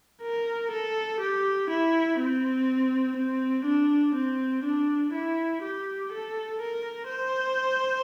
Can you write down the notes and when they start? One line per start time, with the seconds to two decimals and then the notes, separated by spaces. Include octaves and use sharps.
0.22 A#4
0.71 A4
1.20 G4
1.70 E4
2.19 C4
3.17 C4
3.66 D4
4.15 C4
4.64 D4
5.13 E4
5.63 G4
6.12 A4
6.61 A#4
7.09 C5